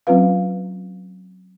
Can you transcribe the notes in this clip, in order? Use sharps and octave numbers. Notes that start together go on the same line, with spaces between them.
F#3 C4 C#4 F4 B4 F5